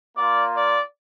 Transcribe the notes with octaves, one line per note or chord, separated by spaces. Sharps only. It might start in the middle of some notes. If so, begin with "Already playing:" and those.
A#3 F4 D5
D5